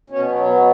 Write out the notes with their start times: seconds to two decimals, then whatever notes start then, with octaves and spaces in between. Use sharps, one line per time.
0.10 B2 C#4
0.28 F#3
0.46 B2 B3